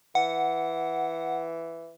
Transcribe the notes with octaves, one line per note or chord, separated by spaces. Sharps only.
E3 F#5